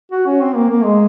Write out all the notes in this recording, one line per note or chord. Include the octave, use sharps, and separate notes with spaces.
F#4
C#4
C4
A#3
A#3
G#3